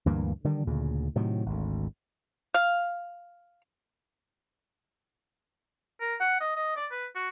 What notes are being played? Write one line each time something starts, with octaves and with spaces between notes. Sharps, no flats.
D2 G2 E3 A#3
D3 D#3 G3
D2 A#2 C#3
A2 C3 D#3 F#3
G#1 D2
F5
A#4
F#5
D#5
D#5
D5
B4
F#4